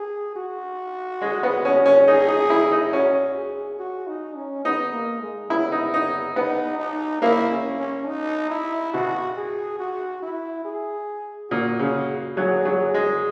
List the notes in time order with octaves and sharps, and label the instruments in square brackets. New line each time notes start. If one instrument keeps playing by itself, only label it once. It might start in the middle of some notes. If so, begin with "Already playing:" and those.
Already playing: [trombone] G#4
F#4
[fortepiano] G#3
B3
C#4
C#4
[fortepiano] D#4 [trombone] G#4
[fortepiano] D#4
E4
D#4
[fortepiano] C#4 [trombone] F#4
[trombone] G#4
F#4
D#4
C#4
[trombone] B3 [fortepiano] D#4
[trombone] A#3
G#3
[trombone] B3 [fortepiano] E4
[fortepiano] D#4
D#4
[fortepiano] B3 [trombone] D#4
[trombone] D#4
[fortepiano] A#3 [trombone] E4
[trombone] C#4
C#4
D#4
E4
[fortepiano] B2 [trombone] F#4
[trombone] G#4
F#4
E4
G#4
[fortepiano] A#2 [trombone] F#4
[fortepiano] C#3
[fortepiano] F#3 [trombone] G#4
[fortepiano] F#3
[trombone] G#4
[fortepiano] G#3